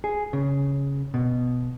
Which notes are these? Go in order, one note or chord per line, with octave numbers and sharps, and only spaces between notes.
G#4
C#3
B2